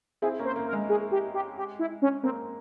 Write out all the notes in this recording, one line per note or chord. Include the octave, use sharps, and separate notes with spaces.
C4 E4 G#4
A#3 C#4
C5
A#3
A#4
G#3
G#4
G4
G4
G4
E4
C#4
A#3 C4